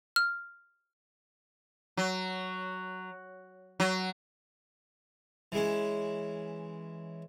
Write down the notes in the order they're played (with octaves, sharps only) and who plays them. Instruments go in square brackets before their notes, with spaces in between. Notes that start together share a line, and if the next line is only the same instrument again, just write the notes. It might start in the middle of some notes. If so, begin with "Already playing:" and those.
[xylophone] F6
[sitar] F#3
F#3
[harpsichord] E3 G#3 C#4